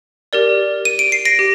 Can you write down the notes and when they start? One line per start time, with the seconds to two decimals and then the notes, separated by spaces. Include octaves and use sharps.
0.33 G4 A#4 D5
0.85 D#7
0.99 D7
1.12 C7
1.25 A#6 D7
1.39 G4